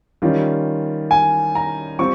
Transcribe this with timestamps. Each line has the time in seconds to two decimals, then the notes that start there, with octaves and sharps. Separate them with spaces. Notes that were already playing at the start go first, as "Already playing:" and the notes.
0.22 D#3 G3 C#4 F4
1.11 G#5
1.55 A#5
1.99 G3 C4 F4 C#6